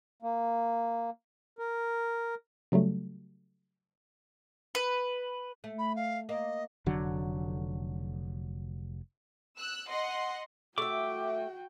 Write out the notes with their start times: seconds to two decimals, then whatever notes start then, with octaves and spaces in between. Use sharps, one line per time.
0.22 A#3
1.59 A#4
2.72 C#3 F#3 G3 A3
4.75 B4
5.64 A3
5.78 B5
5.96 F5
6.29 A#3 D#5
6.86 F1 D3 F#3
9.58 E6 F#6
9.88 D#5 F#5 C6
10.78 A3 F#4 E5 G5 D6